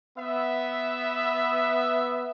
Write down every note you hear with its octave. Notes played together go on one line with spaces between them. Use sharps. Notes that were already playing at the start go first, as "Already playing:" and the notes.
B3 E5